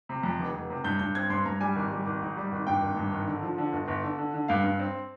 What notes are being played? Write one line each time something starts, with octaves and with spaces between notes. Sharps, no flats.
C3
F2
F1
F1
C3
G2 G6
G2 G6
C4 G#6
G2 C6
G2 A#5
G3 G#5
G#1
G3
G#1
G#2
G3
G#1
G2 G5
G#1
G2
G#1
D3
F3
D3
G1
G1
D3
D3
D3
G2 F5
G2
C4